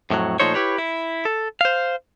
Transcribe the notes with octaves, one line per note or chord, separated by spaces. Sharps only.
F2 A2 D#3 F#3
A#2 F3 A3 D#4 C5 C#5
E4 G4 B4 C#5
E4
A4
C5 F5